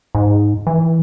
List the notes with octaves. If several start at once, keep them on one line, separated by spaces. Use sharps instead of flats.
G#2
E3